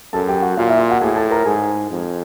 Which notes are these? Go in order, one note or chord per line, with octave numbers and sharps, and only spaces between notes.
F#2 A4 A5
G4 G5
F#4 F#5
A#2 F4 F5
E4 E5
F4 F5
F#4 F#5
A2 G#4 G#5
A4 A5
A#4 A#5
G#2 G#4 G#5
F2